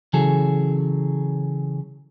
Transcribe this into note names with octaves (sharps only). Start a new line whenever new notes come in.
C#3 E3 F#3 G#4 A4